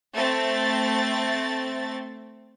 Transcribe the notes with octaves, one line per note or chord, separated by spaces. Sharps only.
A3 C4 A6